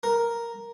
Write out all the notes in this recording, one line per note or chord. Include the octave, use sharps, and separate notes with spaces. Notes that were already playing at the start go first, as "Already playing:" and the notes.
A#4